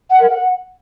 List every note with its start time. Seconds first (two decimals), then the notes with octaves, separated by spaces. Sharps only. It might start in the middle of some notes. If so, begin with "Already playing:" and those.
0.10 F#5
0.19 A#4
0.29 F#5